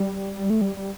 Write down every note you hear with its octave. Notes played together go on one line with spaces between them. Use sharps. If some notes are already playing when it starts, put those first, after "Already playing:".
Already playing: G3
A3
G3
G3